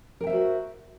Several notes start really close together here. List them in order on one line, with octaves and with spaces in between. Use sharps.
A#4 G5 E5 C5 F#4